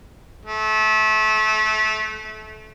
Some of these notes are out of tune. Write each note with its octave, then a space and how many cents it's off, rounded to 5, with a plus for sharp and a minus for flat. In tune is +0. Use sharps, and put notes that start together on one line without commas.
A3 -25